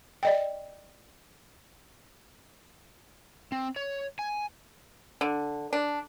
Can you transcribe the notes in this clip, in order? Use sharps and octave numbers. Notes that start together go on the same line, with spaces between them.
D5 D#5 G5
C4
C#5
G#5
D3
D4